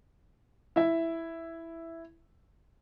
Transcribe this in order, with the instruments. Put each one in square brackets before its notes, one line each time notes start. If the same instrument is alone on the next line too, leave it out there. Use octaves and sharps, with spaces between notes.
[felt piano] E4 E5